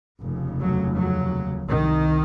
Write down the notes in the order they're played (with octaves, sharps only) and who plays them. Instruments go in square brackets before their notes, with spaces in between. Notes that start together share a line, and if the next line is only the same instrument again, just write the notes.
[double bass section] F1 D#2 C#3
F#3
F#3
C2 C3 D#3